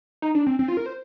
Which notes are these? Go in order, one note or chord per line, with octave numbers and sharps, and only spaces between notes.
D#4
D4
C4
C4
F4
A#4
C5